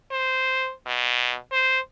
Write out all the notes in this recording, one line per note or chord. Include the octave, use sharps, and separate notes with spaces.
C5
B2
C5